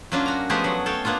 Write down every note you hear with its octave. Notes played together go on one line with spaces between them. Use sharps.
F#3 A#3 C#4 D4 F4
F#4 A#5
F3 G#3 A3 B3 G4 G#4
F#3 F#5
A4 C#5 F5 G5
A#3 B3 D4 F4 A4